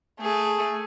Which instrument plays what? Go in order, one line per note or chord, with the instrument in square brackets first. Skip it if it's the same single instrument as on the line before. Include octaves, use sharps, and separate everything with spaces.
[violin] A3 G#4